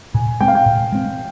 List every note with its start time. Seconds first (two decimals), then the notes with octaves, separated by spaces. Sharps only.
0.14 A#2 G#5
0.41 G#3 C4 G5
0.48 F5
0.55 G5
0.66 A#2
0.92 G#3 C4